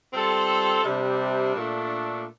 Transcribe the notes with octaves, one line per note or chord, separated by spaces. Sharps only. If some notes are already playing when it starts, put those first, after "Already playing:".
G3 C4 F4 A4
C3 G3 D4
A#2 A3 D4